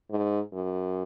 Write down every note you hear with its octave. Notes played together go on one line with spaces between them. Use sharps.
G#2
F#2